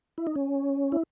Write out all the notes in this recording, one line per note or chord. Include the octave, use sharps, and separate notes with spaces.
E4
D#4
C#4
E4